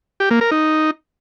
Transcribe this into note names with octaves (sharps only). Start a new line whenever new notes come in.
G4
A#3
A#4
D#4